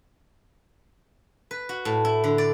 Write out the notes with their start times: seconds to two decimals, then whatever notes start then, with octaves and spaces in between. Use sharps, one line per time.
1.51 B4
1.69 F#4
1.85 A2
2.05 E4
2.24 D3
2.38 D5